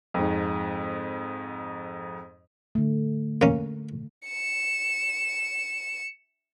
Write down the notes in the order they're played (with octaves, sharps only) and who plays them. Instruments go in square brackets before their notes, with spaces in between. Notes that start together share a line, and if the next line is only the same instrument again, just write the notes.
[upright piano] F2 G#2
[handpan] D3 A3
[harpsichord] A#3 C#4
[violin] C#7 E7